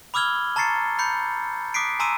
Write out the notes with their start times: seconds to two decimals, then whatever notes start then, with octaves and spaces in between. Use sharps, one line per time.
0.14 B5 D6 E6 F6 G#6 G7
0.56 A5 A#5 C#6 A6 C7 C#7
0.99 B5 G6 C#7
1.74 D6 D#6 F#6 B6 C7 D7
1.99 G#5 A#5 C6 D6 E6 D#7